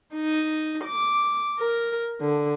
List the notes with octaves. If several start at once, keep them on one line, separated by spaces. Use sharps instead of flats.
D#4
D6
A#4
D3